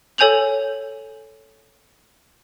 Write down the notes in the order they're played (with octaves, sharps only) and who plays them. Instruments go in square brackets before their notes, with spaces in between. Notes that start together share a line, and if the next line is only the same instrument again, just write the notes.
[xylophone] A4 C#5 G#5 G6 F7 F#7